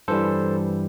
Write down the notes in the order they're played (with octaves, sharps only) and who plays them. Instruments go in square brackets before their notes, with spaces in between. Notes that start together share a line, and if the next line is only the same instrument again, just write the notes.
[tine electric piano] G2 E3 G3 A4 C5